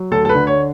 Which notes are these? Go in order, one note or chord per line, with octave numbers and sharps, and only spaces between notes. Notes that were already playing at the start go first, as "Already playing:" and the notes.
Already playing: F#3
D2 A4
A4
B4
D3
C#5